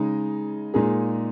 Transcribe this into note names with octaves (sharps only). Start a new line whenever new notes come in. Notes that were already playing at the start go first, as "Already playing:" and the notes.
Already playing: C#3 G#3 D#4
A#2 G#3 D#4 G#4